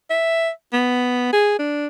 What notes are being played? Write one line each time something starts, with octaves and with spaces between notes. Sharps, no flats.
E5
B3
G#4
D4